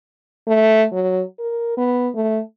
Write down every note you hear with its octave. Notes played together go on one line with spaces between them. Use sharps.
A3
F#3
A#4
B3
A3